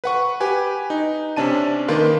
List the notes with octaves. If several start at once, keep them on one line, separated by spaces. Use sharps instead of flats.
B4 F#5 C#6
G4 B4 G#5
D#4
C3 C#4 D4 A5 D#7
D#3 A#3 B4 F5 C6